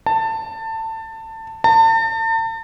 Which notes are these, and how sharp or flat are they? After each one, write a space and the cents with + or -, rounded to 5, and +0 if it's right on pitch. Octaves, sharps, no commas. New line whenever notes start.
A5 +20
A5 +40